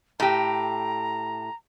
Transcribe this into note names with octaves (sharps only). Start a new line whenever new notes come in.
A2 G4 A#5